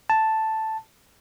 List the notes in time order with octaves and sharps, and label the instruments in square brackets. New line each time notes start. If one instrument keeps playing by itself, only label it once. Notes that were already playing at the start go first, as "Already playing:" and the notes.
[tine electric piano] A5